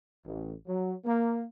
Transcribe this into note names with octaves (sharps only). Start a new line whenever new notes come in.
A1
F#3
A#3